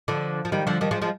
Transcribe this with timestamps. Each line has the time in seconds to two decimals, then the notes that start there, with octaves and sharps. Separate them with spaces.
0.08 D3 F3
0.45 F3
0.52 D#3 G3
0.67 D3 F3
0.81 D#3 G3
0.91 F3 G#3
1.02 F3 G#3